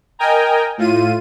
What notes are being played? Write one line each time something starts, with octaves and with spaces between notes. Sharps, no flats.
A#4 D#5 G5 G#5 A#5
A2 F4 D#7